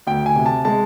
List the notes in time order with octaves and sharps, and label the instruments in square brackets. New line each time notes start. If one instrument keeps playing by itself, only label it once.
[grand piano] D2 G5
G#5
C3
A5
G#3 A5